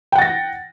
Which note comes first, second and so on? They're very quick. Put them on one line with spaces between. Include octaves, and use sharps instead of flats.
G5 F#5 A6 A#6